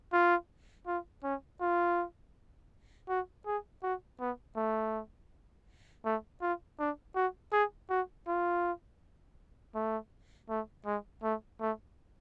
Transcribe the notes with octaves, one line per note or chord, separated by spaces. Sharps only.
F4
F4
C#4
F4
F#4
G#4
F#4
B3
A3
A3
F4
D4
F#4
G#4
F#4
F4
A3
A3
G#3
A3
A3